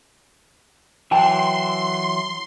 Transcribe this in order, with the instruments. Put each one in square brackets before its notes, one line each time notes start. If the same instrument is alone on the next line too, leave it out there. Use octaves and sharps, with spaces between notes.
[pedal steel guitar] E3 F#3 [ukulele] G5 A5 A#5 [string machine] C6